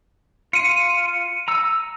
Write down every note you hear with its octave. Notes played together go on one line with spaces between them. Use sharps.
F4 C#7 D#7
A#5 E6